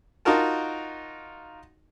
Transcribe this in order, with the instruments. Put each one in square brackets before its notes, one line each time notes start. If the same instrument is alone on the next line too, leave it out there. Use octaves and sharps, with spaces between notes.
[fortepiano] D#4 F4 F#4 A#4 A5